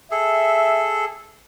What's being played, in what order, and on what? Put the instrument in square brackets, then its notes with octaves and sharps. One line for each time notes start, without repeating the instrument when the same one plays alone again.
[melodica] G#4 A4 [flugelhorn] E5